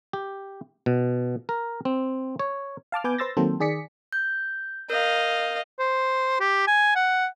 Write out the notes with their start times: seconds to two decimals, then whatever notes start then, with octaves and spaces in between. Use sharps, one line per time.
0.13 G4
0.86 B2
1.49 A#4
1.85 C4
2.39 C#5
2.92 F5 A5 D6 F6
3.04 B3 B4 G#5 D6 G6
3.18 B4 C5 C6 E6 A6 A#6
3.37 D#3 F#3 A#3 C4 A4 C5
3.60 D#3 G#4 D5 B6 C#7
4.13 G6
4.90 A#4 D#5 F5 G6
5.79 C5
6.40 G4
6.67 G#5
6.96 F#5